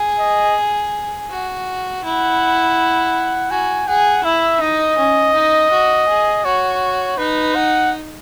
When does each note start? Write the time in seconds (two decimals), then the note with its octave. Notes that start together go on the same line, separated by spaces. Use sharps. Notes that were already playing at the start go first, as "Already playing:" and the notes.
Already playing: G#4
0.19 D#5
1.30 F#4
2.03 E4 F#5
3.51 F#4 G#5
3.87 G#4 F#5
4.24 E4 E5
4.61 D#4 D#5
4.98 C#4
5.34 D#4
5.72 F#4
6.08 G#4
6.45 F#4 C#5
7.18 D#4 B4
7.55 F#5